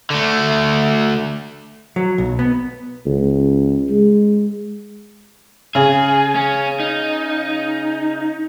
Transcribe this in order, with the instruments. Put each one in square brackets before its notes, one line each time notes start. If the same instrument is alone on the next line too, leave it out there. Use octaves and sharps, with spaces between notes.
[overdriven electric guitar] D3 A3
[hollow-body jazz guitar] F#3
B1
B3
[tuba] C#2
G#3
[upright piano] C#3 [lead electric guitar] G#4
[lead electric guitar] C#4
D#4